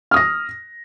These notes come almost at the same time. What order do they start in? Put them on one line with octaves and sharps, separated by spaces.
F6 D#6 A#6